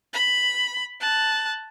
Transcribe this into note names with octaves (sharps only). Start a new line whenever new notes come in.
B5
A5 F#6